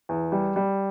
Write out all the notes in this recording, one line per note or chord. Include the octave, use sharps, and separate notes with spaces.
E2
G3
G3